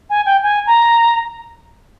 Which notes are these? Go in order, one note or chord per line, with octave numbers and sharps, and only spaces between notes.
G#5
G5
G#5
A#5